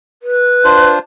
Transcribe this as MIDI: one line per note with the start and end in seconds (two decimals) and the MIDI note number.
0.23 0.91 71
0.64 0.99 62
0.64 0.99 65
0.64 0.99 72